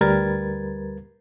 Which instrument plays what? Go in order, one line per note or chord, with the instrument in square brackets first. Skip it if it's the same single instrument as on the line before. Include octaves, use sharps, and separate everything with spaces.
[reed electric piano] D2 G3 A#4 B4 G#6 A6